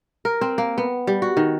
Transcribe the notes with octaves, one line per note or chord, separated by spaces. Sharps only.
A#4
C4
A#3
B3
G3
F#4
D#3